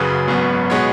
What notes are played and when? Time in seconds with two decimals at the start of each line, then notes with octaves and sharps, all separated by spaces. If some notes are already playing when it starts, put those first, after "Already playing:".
Already playing: F#1 F#2 C#3 B4
0.28 G#1 F#2 F#3 B3
0.70 B2 G#3 B3 C#5